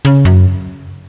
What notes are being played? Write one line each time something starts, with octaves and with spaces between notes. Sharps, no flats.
C#3
F#2